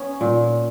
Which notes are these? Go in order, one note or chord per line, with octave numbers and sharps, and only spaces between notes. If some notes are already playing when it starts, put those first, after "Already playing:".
Already playing: B3 C#4
A#2